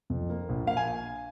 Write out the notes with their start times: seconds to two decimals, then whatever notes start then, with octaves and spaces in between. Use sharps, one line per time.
0.10 F2
0.30 A#3
0.49 A#1
0.67 A#3 F5
0.77 G#5